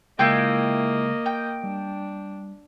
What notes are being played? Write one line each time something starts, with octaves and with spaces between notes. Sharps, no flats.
C#3 G#3 A#3 E4 F4 D#5 G5
G5
G3 D4